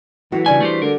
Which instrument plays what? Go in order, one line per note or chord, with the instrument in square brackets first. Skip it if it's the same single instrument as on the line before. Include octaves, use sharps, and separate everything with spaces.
[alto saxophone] E3 [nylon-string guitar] F#3 A3 F#4
[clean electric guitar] C#3 G#5 [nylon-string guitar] G3 D4 F#4
[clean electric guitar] A3 G4 C5
[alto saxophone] D3 [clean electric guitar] A#4